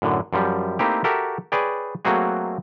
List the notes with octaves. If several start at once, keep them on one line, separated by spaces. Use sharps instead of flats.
F#2 A2 D3
F#2 F3 G3
A3 A#3 C4 D#4 E4 G4
F#4 G4 A4 A#4 E5
G#4 B4 C#5 D5 G5
F#3 A3 A#3 C4 F#4 G#4